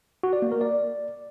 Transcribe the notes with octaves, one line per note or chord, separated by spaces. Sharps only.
F#4
D5
A#3
A#4
D5